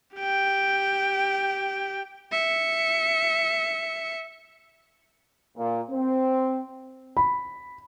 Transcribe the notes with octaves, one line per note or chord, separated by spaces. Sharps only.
G4 G5
E5 C#7
A#2
C4
B5